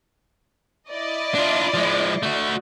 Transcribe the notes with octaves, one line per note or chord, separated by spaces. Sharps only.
E4 D5 D#5
D4 F4
F3 G#3
A3 F#4